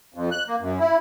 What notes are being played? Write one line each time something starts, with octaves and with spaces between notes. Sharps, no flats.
F2
F#6
A#3
F#2
E4